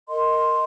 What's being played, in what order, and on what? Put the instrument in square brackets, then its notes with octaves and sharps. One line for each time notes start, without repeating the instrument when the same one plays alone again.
[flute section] A#4 D#5 C6